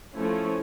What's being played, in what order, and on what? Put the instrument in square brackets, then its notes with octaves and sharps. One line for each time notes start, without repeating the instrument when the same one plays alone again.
[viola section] F3 A3 C#4 E4